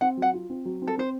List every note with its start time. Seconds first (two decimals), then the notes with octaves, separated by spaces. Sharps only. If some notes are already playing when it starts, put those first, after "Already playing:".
0.01 C4 F#5
0.17 F#3 F#5
0.33 F4
0.50 C4
0.65 F#3
0.82 C4
0.87 A4
0.97 C4 C5